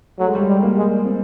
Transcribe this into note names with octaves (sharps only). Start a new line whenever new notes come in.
F#3 A3
G#3
G3
G#3
G3
A#3
G#3
C4